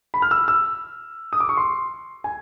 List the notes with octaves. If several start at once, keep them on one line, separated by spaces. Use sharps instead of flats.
B5
F6
E6
E6
D#6
D6
C#6
C6
G#5